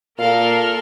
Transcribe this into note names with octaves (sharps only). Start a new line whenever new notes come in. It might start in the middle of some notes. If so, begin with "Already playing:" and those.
A#2 A4 A#4 F5 F6